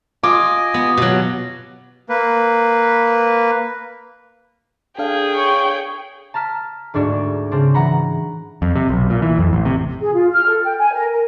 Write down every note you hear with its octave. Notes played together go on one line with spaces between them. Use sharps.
F4 D#5 G#5 D6
B3
B2 F#3
A#3 B4
D4 G#4 A4 F5 G5
C#5
A5 A#5 F6 B6 E7
D2 G#2 D4 F#4 D5
C#3 C4 D4
E3 F#5 A#5 B5
F2
C3
B1
A#2
E3
F2
A1
C3
G#4
F4
F6
A4
G5
G#5
A#4
A#4